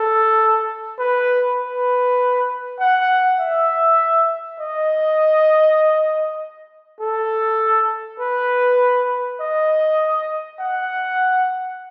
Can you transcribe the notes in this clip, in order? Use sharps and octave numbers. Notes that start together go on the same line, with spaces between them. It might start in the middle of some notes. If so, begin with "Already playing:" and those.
Already playing: A4
B4
B4
F#5
E5
D#5
A4
B4
D#5
F#5